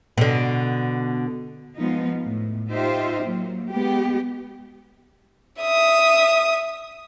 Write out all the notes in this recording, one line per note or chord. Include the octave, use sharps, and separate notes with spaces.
B2 D3
F3 G#3 B3 D#4
A2
D#4 F4 G4 C5 E5
F#3 A#3
G#3 B3 G4
E5 D#6